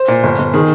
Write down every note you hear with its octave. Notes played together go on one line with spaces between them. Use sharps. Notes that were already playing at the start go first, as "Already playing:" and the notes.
Already playing: C5
A#2
G1
G1
D#3 G#4